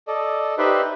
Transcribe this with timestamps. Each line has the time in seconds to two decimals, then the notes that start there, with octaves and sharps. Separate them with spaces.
0.08 A4 D5 D#5
0.58 D#4 G4 B4 C5 D5 E5